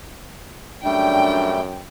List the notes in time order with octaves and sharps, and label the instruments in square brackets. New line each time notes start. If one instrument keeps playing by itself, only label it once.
[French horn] F#2 [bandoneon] G3 A3 [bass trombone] D4 [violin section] G5